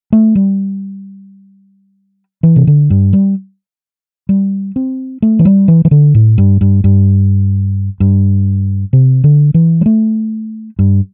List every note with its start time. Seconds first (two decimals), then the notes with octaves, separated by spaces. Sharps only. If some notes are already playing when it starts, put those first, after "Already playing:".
0.13 A3
0.35 G3
2.43 E3
2.56 C3
2.67 D3
2.90 G2
3.13 G3
4.29 G3
4.76 C4
5.22 A3
5.39 E3
5.45 G3
5.68 E3
5.85 E3
5.91 D3
6.15 A2
6.38 G2
6.61 G2
6.84 G2
8.00 G2
8.93 C3
9.24 D3
9.54 E3
9.81 G3
9.86 A3
10.79 G2